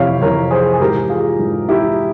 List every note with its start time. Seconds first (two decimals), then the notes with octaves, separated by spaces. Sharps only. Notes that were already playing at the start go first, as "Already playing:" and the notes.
Already playing: F2 C3 E3 E4 G4 C#5 F5
0.21 F2 C3 E3 A#4 C#5
0.51 G#4 C5
0.74 G#4
0.80 G#2 E3 G4 A#4
1.09 F4 G#4
1.39 G#2 E3
1.69 E4 G4